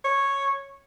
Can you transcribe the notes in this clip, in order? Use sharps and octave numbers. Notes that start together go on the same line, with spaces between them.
C#5